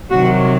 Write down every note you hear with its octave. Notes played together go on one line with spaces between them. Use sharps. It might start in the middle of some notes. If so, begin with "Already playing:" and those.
C3 D#3 F#3 F#4